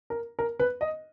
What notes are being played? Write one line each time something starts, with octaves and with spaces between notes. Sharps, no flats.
A#4
A#4
B4
D#5